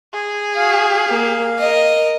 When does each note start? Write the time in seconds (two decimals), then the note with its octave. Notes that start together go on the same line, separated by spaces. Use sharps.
0.13 G#4
0.56 F#4 F5
1.09 A#3
1.59 A#4 D#5